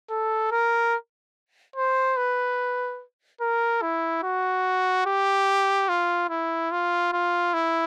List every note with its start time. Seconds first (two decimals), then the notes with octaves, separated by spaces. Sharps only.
0.10 A4
0.52 A#4
1.76 C5
2.17 B4
3.41 A#4
3.82 E4
4.23 F#4
5.06 G4
5.89 F4
6.30 E4
6.72 F4
7.13 F4
7.54 E4